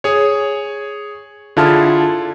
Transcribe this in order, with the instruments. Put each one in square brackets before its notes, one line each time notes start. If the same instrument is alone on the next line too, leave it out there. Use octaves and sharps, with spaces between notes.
[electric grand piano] G#4 C#5
D3 E4 F4 G#4 A5 F6